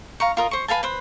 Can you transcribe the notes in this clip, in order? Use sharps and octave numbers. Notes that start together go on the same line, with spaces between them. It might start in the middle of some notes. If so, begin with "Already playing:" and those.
F5 A#5 C#6
F4 A#4 D#5
C5 C#6
B4 F5 G#5 A5
B4 C5